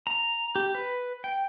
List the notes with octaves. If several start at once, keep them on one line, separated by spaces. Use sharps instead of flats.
A#5
G4
B4
G5